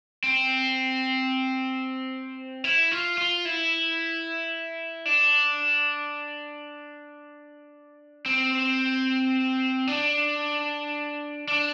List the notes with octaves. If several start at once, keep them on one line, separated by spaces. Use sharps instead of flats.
C4
E4
F4
F4
E4
D4
C4
D4
D4